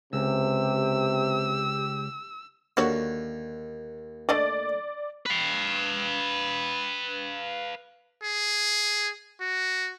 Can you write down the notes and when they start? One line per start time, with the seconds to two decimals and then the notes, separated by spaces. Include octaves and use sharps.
0.13 C#2 C3 G4 E6
2.77 D#2 D3 F#4 C#5
4.29 A3 D4 D5 D#5
5.26 B4 F5
8.23 G#4
9.41 F#4